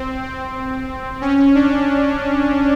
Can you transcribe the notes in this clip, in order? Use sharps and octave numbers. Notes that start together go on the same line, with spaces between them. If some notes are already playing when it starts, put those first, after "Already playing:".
Already playing: C4
C4
C#4
D4